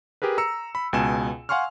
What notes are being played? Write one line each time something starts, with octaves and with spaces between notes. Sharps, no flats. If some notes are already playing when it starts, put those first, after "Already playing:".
G4 G#4 A#4 B4
A#5 E6 C#7
B5
C#2 B2 G#5 A5 E7
F5 F#5 G#5 C6 C#6 F6